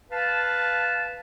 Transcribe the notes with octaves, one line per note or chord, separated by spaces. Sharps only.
B4 F5 A5